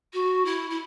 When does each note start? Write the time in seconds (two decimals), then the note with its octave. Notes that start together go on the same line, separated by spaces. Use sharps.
0.13 F#4
0.45 E4
0.70 E4